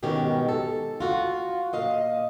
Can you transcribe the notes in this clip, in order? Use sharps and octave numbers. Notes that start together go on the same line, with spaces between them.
G#2 B2 D#3 C#4 G4
A4
F4 F#4
A#2 D#5 F5